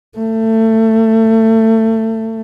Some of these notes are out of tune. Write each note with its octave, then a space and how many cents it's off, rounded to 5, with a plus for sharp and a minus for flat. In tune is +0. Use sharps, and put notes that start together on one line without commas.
A3 +25